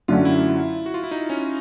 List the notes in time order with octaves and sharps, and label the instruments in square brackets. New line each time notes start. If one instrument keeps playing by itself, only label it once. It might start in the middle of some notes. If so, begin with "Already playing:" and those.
[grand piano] F#2 D3 F#3 A3 C#4 [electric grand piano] F4
[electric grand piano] E4
F#4
F4
E4
D#4
C#4